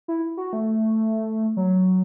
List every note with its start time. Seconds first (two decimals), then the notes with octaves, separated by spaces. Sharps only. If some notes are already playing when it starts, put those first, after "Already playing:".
0.08 E4
0.37 F#4
0.53 A3
1.57 F#3